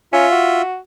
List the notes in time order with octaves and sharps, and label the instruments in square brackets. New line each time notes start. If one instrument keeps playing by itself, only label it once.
[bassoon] C#4 [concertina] F4 E5
[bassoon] F#4